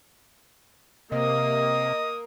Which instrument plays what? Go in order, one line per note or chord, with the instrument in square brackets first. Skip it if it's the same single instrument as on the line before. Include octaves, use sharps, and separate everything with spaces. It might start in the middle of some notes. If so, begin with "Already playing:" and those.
[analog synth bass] C3 [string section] A#3 [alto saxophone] D#5 [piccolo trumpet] D#6